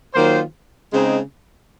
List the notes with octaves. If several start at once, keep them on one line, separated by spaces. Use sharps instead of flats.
D#3 F#3 A#3 F4 C5
C#3 G#3 C4 D#4